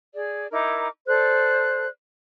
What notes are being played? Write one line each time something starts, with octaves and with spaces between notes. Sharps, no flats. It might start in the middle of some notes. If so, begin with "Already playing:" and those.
G#4 D5
D#4 E4 A#4 D6
A4 C5 D5 F#6